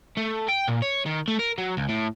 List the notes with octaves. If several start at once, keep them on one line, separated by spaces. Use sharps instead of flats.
A3
G5
A#2
C#5
D#3
A3
A#4
F#3
C#2
A2